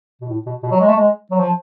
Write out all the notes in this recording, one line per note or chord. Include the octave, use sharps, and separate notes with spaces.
B2
A2
B2
B2
F#3
G#3
A3
G#3
F#3
F3